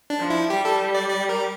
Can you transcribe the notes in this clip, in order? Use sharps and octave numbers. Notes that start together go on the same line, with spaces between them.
D4
F3
E4
G3 G4
A4
D5
D5
A#4